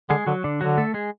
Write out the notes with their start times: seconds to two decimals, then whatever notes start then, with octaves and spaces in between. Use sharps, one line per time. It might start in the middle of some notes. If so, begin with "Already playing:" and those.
0.10 D3 G#3 G#4
0.27 D3 F#3 F#4
0.44 D3 D4
0.61 D3 F#3 F#4
0.78 A3 A4
0.94 G#3 G#4